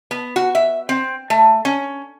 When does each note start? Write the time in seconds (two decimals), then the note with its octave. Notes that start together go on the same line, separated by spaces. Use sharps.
0.11 B3
0.36 F#4
0.55 E5
0.89 C4
1.30 A3
1.65 C#4